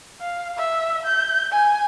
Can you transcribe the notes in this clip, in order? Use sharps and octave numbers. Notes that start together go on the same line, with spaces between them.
F5
E5
G6
G#5